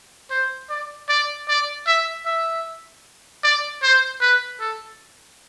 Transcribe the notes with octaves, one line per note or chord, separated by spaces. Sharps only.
C5
D5
D5
D5
E5
E5
D5
C5
B4
A4